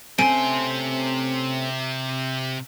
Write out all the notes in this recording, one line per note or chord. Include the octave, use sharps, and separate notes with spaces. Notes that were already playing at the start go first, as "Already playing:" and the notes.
C3 A3 C4 C#4 G#5 C6 D7